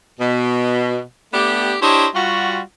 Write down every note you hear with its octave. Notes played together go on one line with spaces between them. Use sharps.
B2
A3 B3 D4 G4
D4 E4 G4 C5 C#5 D#5
G3 F4 F#4